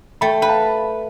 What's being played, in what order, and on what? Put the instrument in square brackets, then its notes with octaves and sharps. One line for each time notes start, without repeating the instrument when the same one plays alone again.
[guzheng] A3 [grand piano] G5 B5
[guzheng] B4 [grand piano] G5
[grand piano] F5 A5